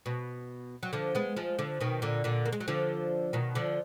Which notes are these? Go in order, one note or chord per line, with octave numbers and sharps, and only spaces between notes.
B2
F#3
D3 F3
G#3 B3
F3 G#3
D3 F3
B2 D#3
A#2 D3
A#2 D3
A#3
G#3
F#3
D3 F3
B2 D#3
D3 F3